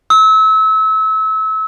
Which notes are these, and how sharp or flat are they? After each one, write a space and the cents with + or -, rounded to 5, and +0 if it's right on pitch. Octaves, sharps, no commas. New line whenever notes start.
E6 -30